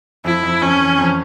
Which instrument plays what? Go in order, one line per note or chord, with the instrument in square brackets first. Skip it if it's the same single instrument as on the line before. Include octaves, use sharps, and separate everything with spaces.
[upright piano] F2 [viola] E4
[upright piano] F2
[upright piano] F2 [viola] C#4
[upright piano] E3
F2